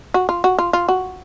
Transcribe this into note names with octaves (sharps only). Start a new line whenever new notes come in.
F#4
F4
F#4
F4
F4
F#4